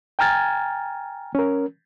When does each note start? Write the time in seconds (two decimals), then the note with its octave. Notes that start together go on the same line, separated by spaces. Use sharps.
0.19 G5 G#5 A#5 F6 G#6 A6
1.35 C#4 A#4